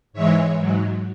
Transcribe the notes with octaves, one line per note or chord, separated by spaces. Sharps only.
G#2 E3 G#3 C#5 E5
G#2 F#3